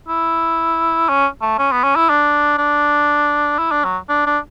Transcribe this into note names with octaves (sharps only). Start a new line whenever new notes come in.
E4
C#4
A3
C#4
B3
C#4
E4
D4
D4
E4
D4
F#3
D4
D4